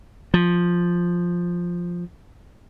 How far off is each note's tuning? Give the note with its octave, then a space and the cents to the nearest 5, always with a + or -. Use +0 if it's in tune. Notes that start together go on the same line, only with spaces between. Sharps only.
F3 +5